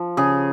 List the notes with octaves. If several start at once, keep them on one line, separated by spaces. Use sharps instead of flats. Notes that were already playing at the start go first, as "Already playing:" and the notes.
Already playing: F3
C#3 G#4